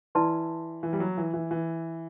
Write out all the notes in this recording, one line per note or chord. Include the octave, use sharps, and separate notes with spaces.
E3 E4 B4 D5 A5 C6
E3
G3
F#3
E3
E3
E3